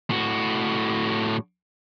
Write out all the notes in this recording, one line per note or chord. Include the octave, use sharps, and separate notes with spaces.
A2 F#4